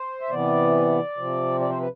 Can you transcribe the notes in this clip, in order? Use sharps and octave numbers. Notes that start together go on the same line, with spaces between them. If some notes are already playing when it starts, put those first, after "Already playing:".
Already playing: C5
E5
C3 E3 B3 D5
C3 F3 C4
D5
C5
B4